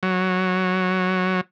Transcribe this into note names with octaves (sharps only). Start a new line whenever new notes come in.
F#3